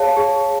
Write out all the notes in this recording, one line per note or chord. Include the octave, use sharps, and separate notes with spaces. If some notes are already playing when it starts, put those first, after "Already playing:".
Already playing: G#4 C#5 F5 A5
G#4